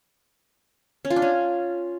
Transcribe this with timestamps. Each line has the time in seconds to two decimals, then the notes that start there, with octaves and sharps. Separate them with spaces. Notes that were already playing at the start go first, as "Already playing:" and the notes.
1.05 C#4
1.10 F4
1.16 D4
1.22 C#4